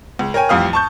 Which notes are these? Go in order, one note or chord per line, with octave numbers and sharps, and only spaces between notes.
C#2
A#4 C#5 G5 G#5
A1 F2 G3 F5 D#6 F6
A5 C#6 G6